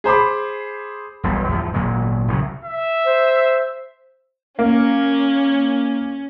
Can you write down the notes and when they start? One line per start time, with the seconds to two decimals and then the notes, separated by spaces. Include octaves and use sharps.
0.04 G#4 C5 B5 D6
1.23 E1 B1 G3
1.49 E2 G#2 F3
1.74 G#1 A#2 F#3 G#3
2.28 C2 C#3 F#3
2.65 E5
3.06 C5
4.59 A#3 C#4